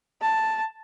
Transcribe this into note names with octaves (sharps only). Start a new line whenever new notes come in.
A5